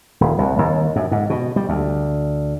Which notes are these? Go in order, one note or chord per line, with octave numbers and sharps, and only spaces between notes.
D#1
C2
D#2
F#2
G#2
B2
G3
D2